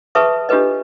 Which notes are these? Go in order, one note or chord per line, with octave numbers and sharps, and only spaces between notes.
G#4 B4 E5 A5 C#6 D#6
D4 F4 G4 A4 B4 D#5